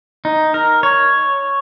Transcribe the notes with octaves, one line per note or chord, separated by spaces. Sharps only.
D#4
A#4
C#5